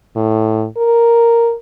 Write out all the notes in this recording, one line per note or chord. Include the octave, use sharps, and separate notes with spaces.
A2
A#4